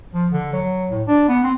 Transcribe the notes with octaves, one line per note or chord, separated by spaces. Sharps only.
F3
D3
F#3
A2
D4
B3
C4